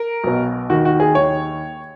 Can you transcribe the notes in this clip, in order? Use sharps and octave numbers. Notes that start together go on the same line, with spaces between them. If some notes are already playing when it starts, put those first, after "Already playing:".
Already playing: A#4
B1 B2
D#2 D#3 F#4
F#4
G#4
D#2 D#3 C#5